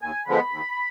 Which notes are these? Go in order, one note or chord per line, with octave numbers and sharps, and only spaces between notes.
D#2 G#5
D3 F3 G#3 B3 B5
D#2